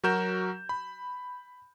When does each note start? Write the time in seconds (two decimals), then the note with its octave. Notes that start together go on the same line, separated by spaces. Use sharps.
0.04 F#3 F#4 A#4 G6 E7
0.69 B5